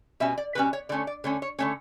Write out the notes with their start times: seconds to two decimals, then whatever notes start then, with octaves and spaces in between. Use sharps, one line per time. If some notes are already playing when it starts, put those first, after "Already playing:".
0.20 B2 G3 C#4 E5
0.38 D5
0.55 B2 G3 C#4 B4
0.73 C#5
0.89 D3 A3 C#4 D5
1.07 D5
1.24 D3 A3 C#4 C#5
1.42 C#5
1.59 D3 A3 C#4 C#5